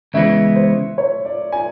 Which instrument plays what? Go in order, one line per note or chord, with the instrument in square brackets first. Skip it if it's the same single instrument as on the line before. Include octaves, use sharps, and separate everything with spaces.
[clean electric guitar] C#2 C#3 E3 G#3 B3 [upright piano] E5
[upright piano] C5
C#5
D5
G#5